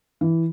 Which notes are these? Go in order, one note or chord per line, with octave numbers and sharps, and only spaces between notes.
E3